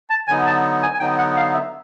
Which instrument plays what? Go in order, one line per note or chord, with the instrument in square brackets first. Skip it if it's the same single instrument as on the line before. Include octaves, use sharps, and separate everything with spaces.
[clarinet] A5
[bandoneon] D3 F#3 B3 D#4 [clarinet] G#5
[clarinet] A5
G#5
G#5
[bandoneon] D3 F#3 B3 D#4 [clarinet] G5
[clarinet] F#5
F5
E5